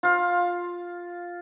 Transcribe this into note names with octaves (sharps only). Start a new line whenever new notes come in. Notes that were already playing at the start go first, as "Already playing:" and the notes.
F4 F5